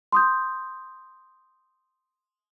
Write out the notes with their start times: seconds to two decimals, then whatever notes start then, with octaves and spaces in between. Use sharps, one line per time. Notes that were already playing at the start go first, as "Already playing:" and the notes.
0.12 C6 D#6 G6